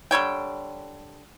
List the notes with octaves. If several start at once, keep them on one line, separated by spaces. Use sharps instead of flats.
D3 G3 C#5 G5